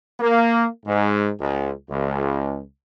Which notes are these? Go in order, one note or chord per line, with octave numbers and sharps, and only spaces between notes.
A#3
G#2
C#2
C#2